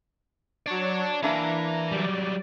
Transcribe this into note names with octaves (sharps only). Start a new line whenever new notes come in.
F#3 C#5 D5 A5
E3 A#3 D4 E4 A#5
F#3 G3 D5